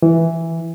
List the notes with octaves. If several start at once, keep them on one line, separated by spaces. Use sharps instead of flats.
E3